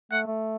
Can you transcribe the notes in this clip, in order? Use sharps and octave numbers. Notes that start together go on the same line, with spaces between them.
A3 F#5
A3